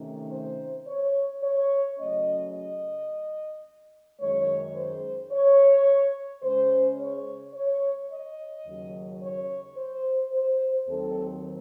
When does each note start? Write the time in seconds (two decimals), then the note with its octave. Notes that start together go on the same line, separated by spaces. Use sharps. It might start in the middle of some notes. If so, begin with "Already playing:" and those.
Already playing: C3 D#3 A3 C#4
0.32 C5
0.87 C#5
1.43 C#5
1.99 C#3 F#3 A3 C#4 D#5
2.54 D#5
4.21 F#2 D#3 G#3 C#5
4.76 C5
5.32 C#5
6.43 C#3 G#3 C#4 C5
6.98 C#5
7.54 C#5
8.10 D#5
8.66 D#2 C#3 F#3
9.21 C#5
9.77 C5
10.32 C5
10.87 D#2 D#3 F#3 C4 D#4 A4